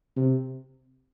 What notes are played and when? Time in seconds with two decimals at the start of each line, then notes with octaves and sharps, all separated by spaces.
0.16 C3